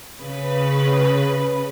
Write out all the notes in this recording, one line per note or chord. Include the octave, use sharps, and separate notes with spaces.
C#3 B4